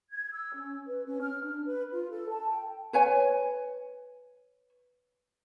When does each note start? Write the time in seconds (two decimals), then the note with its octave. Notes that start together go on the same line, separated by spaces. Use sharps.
0.11 G#6
0.32 E6
0.54 C#4
0.86 B4
1.06 C#4
1.21 F6
1.43 D4
1.66 B4
1.92 F4
2.10 A4
2.29 A5
2.49 G5
2.93 B4 C#5 G#5